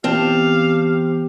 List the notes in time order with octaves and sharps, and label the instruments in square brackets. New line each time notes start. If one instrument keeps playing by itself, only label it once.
[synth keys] E3 B3 [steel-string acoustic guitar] C4 A5 [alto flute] G4 [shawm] F5